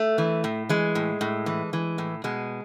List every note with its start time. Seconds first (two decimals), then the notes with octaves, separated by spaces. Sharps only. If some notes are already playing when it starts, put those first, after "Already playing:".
Already playing: A3
0.18 E3
0.44 A2
0.69 E3 G#3
0.95 A2
1.21 A2
1.46 E3
1.73 E3
1.98 A2
2.24 B2 G#3